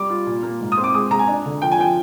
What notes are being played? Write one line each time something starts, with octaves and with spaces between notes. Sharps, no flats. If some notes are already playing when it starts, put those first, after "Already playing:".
Already playing: G3 D6
F4
A#2
A#3
G#2
D#6
C4
D6
G#3 D#6
G#3 A#5
G#5
D4
D3
F3 G5
G#5
F3 G5